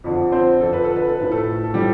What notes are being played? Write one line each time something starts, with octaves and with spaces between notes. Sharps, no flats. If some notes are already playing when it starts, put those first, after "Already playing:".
F2 D3 F3
C4 C5
F2 D3 F3 A4
B4
A4
B4
A4
A2 F3 B4
A3 A4
A4
A2 F3 G3 G4